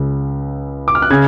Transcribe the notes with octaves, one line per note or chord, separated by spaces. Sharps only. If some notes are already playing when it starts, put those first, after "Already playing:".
Already playing: C#2 C#3
D6
F6
F#6
C#3 G#6